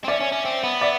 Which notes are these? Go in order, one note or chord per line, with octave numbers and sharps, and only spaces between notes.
C4
C#4 D5 E5
C#4
C#4
C4
B3
D5 E5